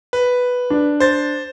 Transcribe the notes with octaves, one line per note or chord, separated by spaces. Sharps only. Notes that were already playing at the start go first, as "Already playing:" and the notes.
B4
D4
C5 A6